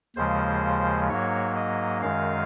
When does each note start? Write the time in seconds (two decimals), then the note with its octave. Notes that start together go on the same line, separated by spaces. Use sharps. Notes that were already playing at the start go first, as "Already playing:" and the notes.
0.16 D#2 C#3 F3 G#3 C5
1.09 G#2 F#3 A#3 C#5
1.56 D#5
2.02 F#2 D#3 G#3 F5